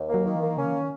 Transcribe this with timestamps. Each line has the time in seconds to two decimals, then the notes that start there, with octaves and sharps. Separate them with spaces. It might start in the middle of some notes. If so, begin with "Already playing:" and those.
Already playing: D#2
0.09 A#3
0.14 F#3
0.25 D#3
0.35 E3
0.41 A#3
0.57 C#3 C#4
0.65 E3
0.73 D#3